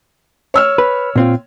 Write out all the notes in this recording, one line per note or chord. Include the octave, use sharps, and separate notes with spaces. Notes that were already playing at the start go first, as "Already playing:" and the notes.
C#5 E6 F6
B4
A#2 C4 F4